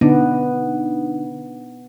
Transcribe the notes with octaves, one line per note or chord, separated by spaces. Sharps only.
D3 B3 D4 D#4